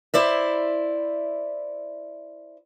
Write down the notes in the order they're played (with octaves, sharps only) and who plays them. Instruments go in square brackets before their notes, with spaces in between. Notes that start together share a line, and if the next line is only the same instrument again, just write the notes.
[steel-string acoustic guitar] E4 C5 D5 E5